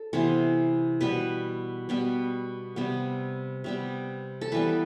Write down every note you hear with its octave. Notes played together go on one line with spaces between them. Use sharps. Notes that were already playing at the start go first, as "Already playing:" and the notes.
Already playing: A4
C3 E3 B3 C5
B2 G3 B3 B4
B2 G3 B3
C3 G3 B3
C3 G3 B3
A4
E3 G3 B3 B4